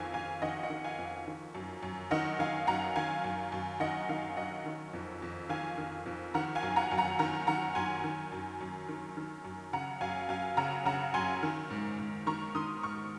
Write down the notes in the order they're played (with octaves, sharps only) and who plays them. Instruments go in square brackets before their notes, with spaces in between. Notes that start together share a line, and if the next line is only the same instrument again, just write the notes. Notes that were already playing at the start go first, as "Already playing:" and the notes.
Already playing: [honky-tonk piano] F2 D#3 F5 G#5
F2 F5 G#5
D#3 D#5 F#5
D#5 F#5
D#3
F5 G#5
F2
D#3
F#2
F#2
D#3 D#5 F#5
D#3 F5 G#5
F#2 F#5 A#5
D#3 F5 G#5
F#2
F#2
D#3 D#5 F#5
D#3 F5
F#2 D#5 F#5
D#3
F2
F2
D#3 F5 G#5
D#3
F2
D#3 F#5 A#5
F5 G#5
F#2
F#5 A#5
F#2
F#5 A#5
D#3 F#5 A#5
D#3 F#5 A#5
F#2 G#5 C6
D#3
F#2
F#2
D#3
D#3
F#2
C#3 F#5 A#5
F#2 F5 G#5
F#2 F5 G#5
C#3 F#5 A#5
C#3 F#5 A#5
F#2 G#5 C6
D#3
G#2
G#2
D#3 A#5 C#6
D#3 C6 D#6
G#2 C#6 F6